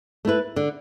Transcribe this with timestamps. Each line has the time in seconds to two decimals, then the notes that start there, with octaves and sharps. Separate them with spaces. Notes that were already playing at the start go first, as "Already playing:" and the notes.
0.25 A3 E4 B4
0.56 D3